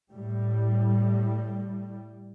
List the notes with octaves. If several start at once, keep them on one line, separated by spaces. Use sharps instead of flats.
A2 G3